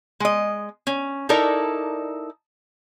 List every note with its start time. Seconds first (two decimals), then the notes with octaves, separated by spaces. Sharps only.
0.20 G#3 D#5
0.87 C#4
1.29 D#4 E4 A4 A#4 D5